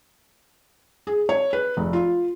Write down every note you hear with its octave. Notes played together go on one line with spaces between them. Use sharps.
G#4
C#5
B4
F1
F4